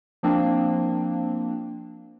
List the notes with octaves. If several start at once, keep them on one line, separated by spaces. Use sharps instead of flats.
F3 A#3 C4 D4